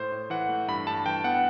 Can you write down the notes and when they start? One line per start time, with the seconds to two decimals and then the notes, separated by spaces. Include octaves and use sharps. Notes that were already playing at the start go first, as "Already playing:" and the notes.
Already playing: A2 C5
0.12 A2
0.30 E3 F#5
0.49 A3
0.68 G2 B5
0.87 G2 A5
1.06 E3 G5
1.24 B3 F#5